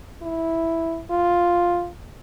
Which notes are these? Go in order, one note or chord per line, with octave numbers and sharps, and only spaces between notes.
E4
F4